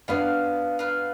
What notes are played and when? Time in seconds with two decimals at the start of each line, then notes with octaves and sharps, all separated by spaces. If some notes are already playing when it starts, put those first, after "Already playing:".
0.08 B3 D4 F4 B4 F5
0.79 F4 B4 F5